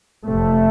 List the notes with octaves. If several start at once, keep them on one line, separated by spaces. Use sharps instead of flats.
F1 F2 C3 A3